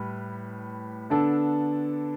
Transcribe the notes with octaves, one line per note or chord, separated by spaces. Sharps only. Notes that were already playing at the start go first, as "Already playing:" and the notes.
Already playing: A2 G3 B4
D3 B3 D4 A4